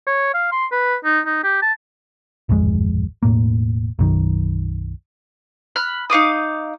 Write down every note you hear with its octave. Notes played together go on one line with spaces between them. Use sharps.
C#5
F5
C6
B4
D#4
D#4
G4
A5
D1 G#1 F2 G#3
E1 A2 A#3
B1 F#2 D#3
B5 F6 F#6
D#4 F5 D6 D#6